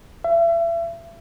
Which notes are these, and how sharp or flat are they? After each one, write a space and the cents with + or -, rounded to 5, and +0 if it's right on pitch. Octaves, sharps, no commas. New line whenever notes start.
E5 +35